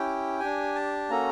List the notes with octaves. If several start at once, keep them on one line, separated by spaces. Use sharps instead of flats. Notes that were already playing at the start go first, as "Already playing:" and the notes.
Already playing: C#4 E4 G4 G5
D4 G4 G#5
A5
A#3 C#4 F#4 A4 A#5